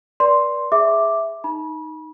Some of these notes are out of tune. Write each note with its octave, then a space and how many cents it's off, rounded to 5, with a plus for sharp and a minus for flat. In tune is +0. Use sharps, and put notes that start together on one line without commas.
B4 -40 D5 -10 C6 +0
G#4 +0 E5 +0 D6 +0
D#4 +0 B5 -35